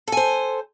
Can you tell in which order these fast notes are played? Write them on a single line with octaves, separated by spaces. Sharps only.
A4 G#5 C5